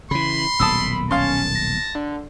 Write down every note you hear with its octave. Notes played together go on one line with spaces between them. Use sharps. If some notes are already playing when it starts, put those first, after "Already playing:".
C#3 E3 B5 C6
D#1 B1 A#2 A5 D#6 E6
C#4 F5 A5 C6
A#6
D3